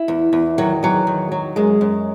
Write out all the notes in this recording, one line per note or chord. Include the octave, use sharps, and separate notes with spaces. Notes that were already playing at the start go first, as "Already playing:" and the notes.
Already playing: E4
E2
E2
D#3 F#3
E2 F#3
D#3
F#3
F#2 G#3
F#2